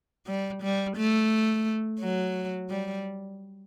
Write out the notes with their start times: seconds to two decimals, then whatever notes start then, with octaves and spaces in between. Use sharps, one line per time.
0.27 G3
0.62 G3
0.96 A3
2.00 F#3
2.69 G3